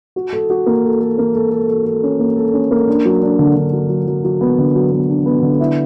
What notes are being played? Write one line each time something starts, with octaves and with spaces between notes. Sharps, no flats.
F#4
A4
F#4
A#3
A4
A4
A#3
A4
A4
A4
A4
C#4
A#3
A4
C#4
A#3
D4
F#3
D4
D3
D3
F#3
F#3
F#3
F#3
B3
D3
F#3
B3
D4
B3
D3
E4